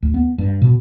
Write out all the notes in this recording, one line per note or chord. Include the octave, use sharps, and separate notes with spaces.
D2
B3
G2
B2